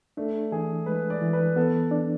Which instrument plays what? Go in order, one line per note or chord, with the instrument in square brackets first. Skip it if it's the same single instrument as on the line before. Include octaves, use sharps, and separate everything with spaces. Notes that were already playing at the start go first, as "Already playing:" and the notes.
[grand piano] A3 [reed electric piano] D4
[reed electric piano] E3 [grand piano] G#4
[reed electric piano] G#3 [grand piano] B4
[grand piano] D5
[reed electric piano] E3
[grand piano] B4
[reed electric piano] B3 [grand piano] A4
[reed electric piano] D4